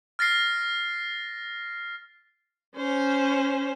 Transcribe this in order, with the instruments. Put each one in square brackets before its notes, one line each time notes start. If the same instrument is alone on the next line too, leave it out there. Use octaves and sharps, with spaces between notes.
[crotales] F6 A6 A#6 C7
[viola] C#4 C5